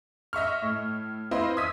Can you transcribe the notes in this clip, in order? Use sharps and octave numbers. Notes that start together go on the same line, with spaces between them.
D#5 E5 C#6 F6
A2
C4 E4 B4 D#5 F5 C6
D#6 E6 G#6 B6 D#7